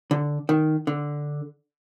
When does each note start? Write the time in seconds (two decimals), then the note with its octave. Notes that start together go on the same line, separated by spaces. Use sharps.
0.11 D3
0.49 D#3
0.87 D3